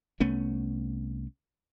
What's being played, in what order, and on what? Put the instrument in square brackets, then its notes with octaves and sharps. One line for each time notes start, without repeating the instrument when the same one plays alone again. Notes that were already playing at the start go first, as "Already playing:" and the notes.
[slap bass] C2 A3 B3 C#4